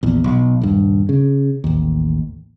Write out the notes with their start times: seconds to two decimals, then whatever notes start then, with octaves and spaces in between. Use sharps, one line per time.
0.03 A#1 E2
0.24 B1
0.62 D#1 G2
1.09 C#3
1.64 A1 D#2